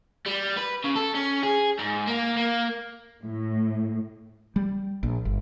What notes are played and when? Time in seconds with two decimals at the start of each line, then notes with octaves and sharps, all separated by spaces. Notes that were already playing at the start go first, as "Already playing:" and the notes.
0.26 G3
0.57 B4
0.84 C#3
0.95 A4
1.14 C#4
1.43 G#4
1.79 G#2
2.08 A#3
2.37 A#3
3.23 A2
4.56 G3
5.03 A#1
5.25 G1